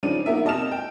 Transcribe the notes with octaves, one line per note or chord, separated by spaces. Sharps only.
C#3 F3 D4 D#4 D#7
A#3 B3 D#4 A#4 E5
C3 D#5 A5 F6 E7
G5